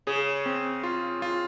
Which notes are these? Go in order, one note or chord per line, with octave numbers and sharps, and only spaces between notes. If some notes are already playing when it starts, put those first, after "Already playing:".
C#3 G#4
C4
F4
F4